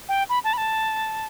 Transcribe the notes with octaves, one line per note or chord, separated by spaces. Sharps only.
G5
B5
A5
B5
A5